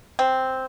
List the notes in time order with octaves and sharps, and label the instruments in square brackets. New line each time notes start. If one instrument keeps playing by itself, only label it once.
[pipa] C4